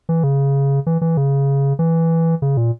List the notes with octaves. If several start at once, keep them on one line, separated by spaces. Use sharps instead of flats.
E3
C#3
E3
E3
C#3
E3
C#3
A#2